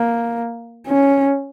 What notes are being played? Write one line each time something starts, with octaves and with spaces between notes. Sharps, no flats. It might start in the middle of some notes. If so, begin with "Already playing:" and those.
Already playing: A#3
C#4